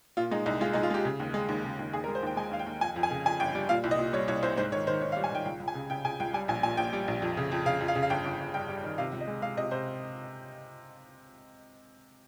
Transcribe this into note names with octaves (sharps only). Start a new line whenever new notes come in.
A#2 F4
G#3 D#4
C2 D#4
G#3 F4
G#3 D#4
F4
G#3 G4
C#3
D#2
G#3
D#2
C#3
D#2
D#2 G#4
A#4
G#3
C5
D#2 G5
G#3 G#5
D#2 F5
G5
D#2
F2 G#5
F2
G#5
C#3
F2 G#5
G1 G5
G3
A#2 F5
C2
D#5
A#2
G3 C#5
C2 C#5
C2 C5
G#2 C5
D#3 C#5
D#3 C5
D#3 C#5
F5
G3
G#5
D#3 G5
C#2 G5
C#2
G#5
C#3
C#3 G5
C#3 G#5
C#2 G5
G3 G#5
A#1 G#5
A#2 G#5
A#1 G5
G3
A#1
F2
C#3
F2
C#3 F5
F2
F5
C#3
F5
G1 G5
G1
G1
G2 G5
G3
D#3
C3 F5
C#2
D#5
G#3
G#3 F5
C3 D#5
C3 C5